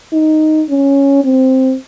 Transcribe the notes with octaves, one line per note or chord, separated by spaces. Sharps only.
D#4
C#4
C4